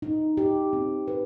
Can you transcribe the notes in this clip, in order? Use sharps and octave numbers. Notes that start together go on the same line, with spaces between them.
D#4
G4
C4
B4